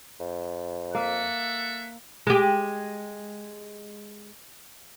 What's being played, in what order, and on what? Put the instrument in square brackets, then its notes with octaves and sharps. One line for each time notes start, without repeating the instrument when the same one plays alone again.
[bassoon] F2
[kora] A#3 [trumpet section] A4 E5 F#5
[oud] G#3 G4